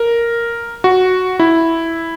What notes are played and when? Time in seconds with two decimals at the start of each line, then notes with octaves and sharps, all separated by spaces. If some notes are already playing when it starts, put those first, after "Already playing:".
Already playing: A#4
0.84 F#4
1.39 E4